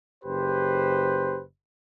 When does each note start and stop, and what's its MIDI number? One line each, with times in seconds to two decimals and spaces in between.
0.25 1.43 30
0.25 1.43 67
0.25 1.43 71
0.25 1.43 72